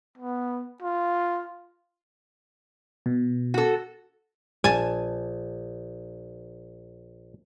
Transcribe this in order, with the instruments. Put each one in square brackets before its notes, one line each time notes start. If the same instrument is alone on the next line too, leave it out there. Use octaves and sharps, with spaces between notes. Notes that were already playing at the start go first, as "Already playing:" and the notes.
[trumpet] B3
F4
[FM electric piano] B2
[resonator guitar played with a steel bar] F#4 A4
[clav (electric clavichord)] A#1 [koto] G#5 A5